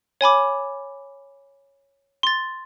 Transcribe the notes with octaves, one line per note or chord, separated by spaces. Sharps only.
C#5 G#5 B5 D6
C6 A6